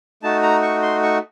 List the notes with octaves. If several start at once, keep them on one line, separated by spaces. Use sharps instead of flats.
A3 D#4 F#4 A5
A#5
C#6
C6
C#6